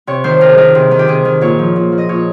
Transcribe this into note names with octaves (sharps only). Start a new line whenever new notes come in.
C3 C#5
D#3 C5
C3 A#4
G#4
D#3 A#4
C3
D#3
G4
C3 G#4
D#3
A#2 C#5
F3
A#2
F3
D#5
A#2 C#5